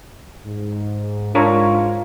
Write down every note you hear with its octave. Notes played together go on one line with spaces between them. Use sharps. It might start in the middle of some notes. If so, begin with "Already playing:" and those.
G#2
G#2 D4 F4 A#4 C#5